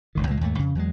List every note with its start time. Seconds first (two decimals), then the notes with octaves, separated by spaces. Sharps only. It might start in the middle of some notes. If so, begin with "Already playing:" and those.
0.15 F1 C#2 D#3
0.27 C#2 A#2 F#3 G#3
0.41 D#2 G#2 A3
0.59 F2 C#3
0.75 E2 F#3 G#3